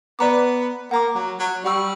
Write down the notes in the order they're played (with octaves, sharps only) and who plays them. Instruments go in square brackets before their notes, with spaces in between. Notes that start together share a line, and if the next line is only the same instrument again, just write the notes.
[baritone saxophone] B3 [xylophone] B4 D5 A#5 D6
[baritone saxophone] A#3 [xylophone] F#5 A#5 D6
[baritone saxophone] F#3
F#3
[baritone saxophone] G3 [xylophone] D5 F#5 C#6 E6